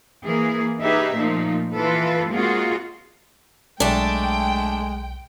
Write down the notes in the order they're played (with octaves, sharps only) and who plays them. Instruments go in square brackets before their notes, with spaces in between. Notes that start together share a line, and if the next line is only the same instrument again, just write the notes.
[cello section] E3 A#3 G#4
D#4 G4 G#4 B4 E5
A#2 F3 A3 D#4
E3 F4 A4 B4
G#3 A#3 C4 F4 F#4 G#4
[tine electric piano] B1 [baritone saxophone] G#3 [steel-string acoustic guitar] A3 D4 [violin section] G5